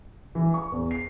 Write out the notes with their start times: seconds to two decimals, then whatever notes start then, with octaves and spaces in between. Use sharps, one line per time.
0.35 E3
0.54 C#6
0.72 E2
0.91 C7